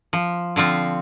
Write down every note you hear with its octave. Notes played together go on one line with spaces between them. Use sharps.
F3
D3 F3 C4 F4